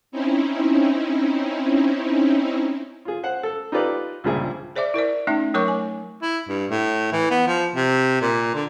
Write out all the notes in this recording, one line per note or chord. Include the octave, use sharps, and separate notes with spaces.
C4 C#4 D#4 E4
F4 G#4
C5 F#5
A4
D#4 F4 G4 A4 B4 D5
C#2 G2 A#2 F3 G#4 E5
G#4 C5 D5 E5 D6
E4 A#4 C5 D5
A3 C#4 D#4 E5
F#3 A3 A#4 C#5 C#6 D6
G#5
E4
G2
A2
E3
B3
F3
C3
A#2
D3